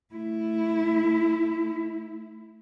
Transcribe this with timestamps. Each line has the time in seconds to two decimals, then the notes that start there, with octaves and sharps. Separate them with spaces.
0.14 A3 E4